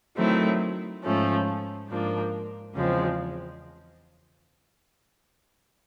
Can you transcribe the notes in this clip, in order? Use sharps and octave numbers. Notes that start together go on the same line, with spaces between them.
D#3 F#3 A3 C4 E4
G#2 F3 A3 C#4
G#2 F3 A#3 D4
E2 C#3 F3 G#3 C4